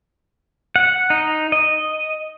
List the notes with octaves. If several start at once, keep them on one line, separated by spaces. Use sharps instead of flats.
F#5
D#4
D#5